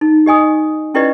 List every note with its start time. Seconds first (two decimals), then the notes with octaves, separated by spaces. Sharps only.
0.01 D#4
0.26 G4 D#5 G#5 D#6
0.94 C#4 E4 G4 B4 D5 D#5